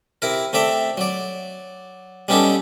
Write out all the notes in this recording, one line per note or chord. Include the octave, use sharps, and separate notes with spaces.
C3 E4 A#4
A3 C4 D5 E5
F#3 D5
G3 B3 C#4 D#4 G4 A4